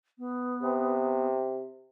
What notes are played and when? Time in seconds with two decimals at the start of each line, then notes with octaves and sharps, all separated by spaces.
0.18 B3
0.63 C3